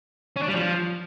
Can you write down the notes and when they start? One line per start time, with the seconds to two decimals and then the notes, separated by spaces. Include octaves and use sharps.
0.37 C#4
0.43 D4
0.49 G3
0.55 F3